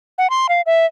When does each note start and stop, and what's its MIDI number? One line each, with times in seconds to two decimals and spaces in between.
0.18 0.30 78
0.30 0.47 84
0.49 0.61 77
0.66 0.86 76